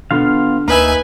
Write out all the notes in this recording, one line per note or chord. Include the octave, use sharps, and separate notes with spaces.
D3 B3 F4 F5
D2 A#3 D#4 B4 E5 G#5